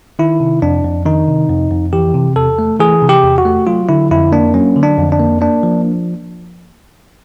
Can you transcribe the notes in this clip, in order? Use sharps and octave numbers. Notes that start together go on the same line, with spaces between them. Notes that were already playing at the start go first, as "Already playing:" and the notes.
D#3 E4
C3
F2 D4
F2
D#3 D#4
C3
F2
F2
E3 G4
C3
E2 A4
A3
E3 G#4
C3
G4
E2
F#4
A3
F#3 F4
D3 E4
F2 E4
A#3 D4
F#3 C#4
D3
D4
F2
D4
A#3
A#3 D4
F3